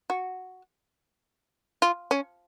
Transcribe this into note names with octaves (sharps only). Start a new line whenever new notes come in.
F#4
F4
C#4